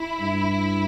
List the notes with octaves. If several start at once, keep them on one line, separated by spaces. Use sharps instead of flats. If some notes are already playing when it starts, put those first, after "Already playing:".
Already playing: E4
G2